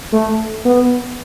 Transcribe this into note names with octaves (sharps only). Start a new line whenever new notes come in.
A3
B3